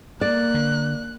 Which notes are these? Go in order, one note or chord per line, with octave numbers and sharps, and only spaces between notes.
A#3 D5 F#6
D3